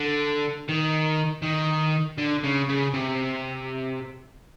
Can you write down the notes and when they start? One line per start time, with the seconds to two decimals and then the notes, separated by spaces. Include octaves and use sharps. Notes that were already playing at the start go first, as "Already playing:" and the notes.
Already playing: D3
0.68 D#3
1.43 D#3
2.18 D3
2.44 C#3
2.69 C#3
2.94 C3